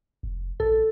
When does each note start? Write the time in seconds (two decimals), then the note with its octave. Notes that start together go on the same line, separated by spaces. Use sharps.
0.23 F1
0.60 A#1 A4